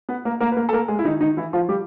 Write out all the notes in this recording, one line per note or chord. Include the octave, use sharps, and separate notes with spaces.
B3 B4
A#3 A#4
A#3 A#4
B4
A#3 A#4
A4
A#3 A#4
G#3 G#4
E4
D#3 D#4
D#3 D#4
E3 E4
F3 F4
G3 G4